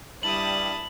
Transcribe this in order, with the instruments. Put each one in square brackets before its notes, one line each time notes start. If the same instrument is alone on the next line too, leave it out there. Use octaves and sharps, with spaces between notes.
[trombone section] G2 G3 [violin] E4 [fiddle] A5 D#6 [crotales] F#7